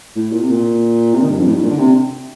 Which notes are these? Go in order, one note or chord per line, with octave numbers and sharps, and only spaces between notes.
A2
A#2
C3
A#2
C3
D#3
G2
F2
A2
G2
A#2
D3
C3